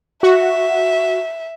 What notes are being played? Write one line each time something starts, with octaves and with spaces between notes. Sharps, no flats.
F#4 E5